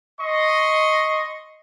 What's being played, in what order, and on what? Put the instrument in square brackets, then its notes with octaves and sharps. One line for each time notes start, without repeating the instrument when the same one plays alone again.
[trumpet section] D#5 C6 C#6